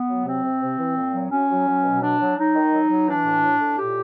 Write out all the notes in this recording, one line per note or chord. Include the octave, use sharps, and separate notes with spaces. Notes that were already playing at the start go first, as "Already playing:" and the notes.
Already playing: B3
F#3
C3 C4
C3
C3
E3
A#2
F#3
F#3 C#4
F#3
F#3
B2
F#3 D4
F#3
F#3 D#4
D#3
F#3
F#3
E3 D4
A2
A2
A2
A#2 G4